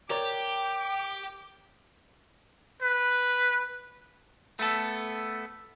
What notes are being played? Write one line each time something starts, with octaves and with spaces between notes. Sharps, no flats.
G4 A#4 C#5 D5 G5 D6
B4
A3 B3 A4